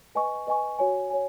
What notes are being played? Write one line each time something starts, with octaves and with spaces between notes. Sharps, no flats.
B4 D#5 G#5 C#6
B4 D#5 G#5 C#6
F#4 C#5 G#5
C#5 G#5